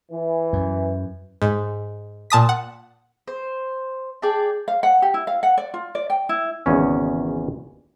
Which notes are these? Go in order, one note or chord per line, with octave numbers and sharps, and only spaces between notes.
E3
F#2
G#2
A#2 A5 D#6 B6
F#5
C5
G#4 D5 G5 A5
F5
F#5
G4
E4
F5
F#5
D5
F4
D5
G5
E4
G#1 E2 C#3 G#3 C#4